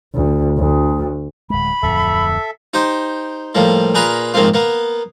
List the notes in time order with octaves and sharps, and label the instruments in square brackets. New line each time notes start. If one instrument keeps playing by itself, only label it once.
[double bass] D2
D2
[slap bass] D1 G#3 [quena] B5
[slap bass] D1 F2 F3 [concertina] A4 E5
[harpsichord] D#4 G4 C5
A2 F3 G3 A#3
A#2 G#4 A#4 B4 A#5 B5
A#1 G#2 A#3 C4 F4
A#3 B3